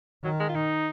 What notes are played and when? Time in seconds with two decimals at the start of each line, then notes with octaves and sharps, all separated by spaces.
0.24 D#3 F#3
0.40 G#3
0.49 F4
0.56 D#4